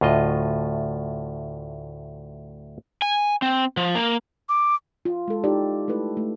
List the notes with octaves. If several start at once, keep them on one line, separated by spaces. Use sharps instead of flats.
D2 A2 F4 D#5
G#5
C4
F3
A#3
D6
F4
G#3 A4
D#4 E4 G4 D5
A3 E4 A4 B4
A3